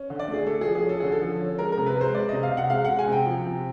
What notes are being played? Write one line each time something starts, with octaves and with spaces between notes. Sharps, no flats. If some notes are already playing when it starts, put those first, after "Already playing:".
Already playing: C#4
D3
D5
A3
G#4
A3 A4
F3 G#4
G#4
C#4 A4
D3 G#4
A4
F3
C#4
G#3 A#4
A#4
C3
B4
G#3 C5
G#3 D5
C3 D#5
F5
C3
F#5
G#3 F5
G#3 F#5
G#5
C3 G5
F3
C3